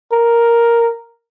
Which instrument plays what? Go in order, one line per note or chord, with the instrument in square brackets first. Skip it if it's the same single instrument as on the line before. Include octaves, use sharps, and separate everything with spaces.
[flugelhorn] A#4